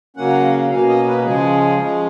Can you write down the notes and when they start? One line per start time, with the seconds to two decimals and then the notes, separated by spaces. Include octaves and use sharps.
0.16 C#3 F#3 A#3 C#4 F#5
0.70 B2 A#3 C#4 F5
0.88 D#5
1.07 B4
1.24 C#3 F3 G#3 C#4 G#4
1.78 F3 G#3 C#4